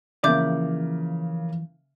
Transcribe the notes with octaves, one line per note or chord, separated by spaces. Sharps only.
C#3 E3 F3 A#3 D5 E5 D6 G6